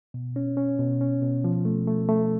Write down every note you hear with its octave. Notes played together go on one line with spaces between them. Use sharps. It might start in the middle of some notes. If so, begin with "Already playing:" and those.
B2
C#4
C#4
B2
C#4
B2
F3
A3
A3
A3